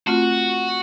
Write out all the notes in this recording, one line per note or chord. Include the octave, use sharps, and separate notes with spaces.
A3 C4 F4 F#4